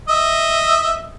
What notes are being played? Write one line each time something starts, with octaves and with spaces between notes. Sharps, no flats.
D#5 E5